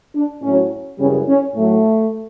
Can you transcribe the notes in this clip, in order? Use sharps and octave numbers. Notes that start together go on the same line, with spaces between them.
D4
A2 C#4
F#3
F#2 C#3 E3 G3 C#4
C#4
A2 F#3 A3